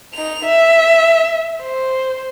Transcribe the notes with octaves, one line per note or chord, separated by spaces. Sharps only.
D#4 F7
E5
C5